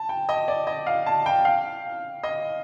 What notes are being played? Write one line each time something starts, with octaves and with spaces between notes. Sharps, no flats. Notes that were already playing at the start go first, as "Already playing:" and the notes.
Already playing: A5
G5
D#5
D5
D#5
F5
A5
G5
F5
D#5